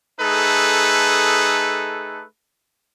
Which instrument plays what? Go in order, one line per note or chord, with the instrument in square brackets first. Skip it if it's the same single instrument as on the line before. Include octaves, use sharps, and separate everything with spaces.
[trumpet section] A3 D#4 G#4 A4 B4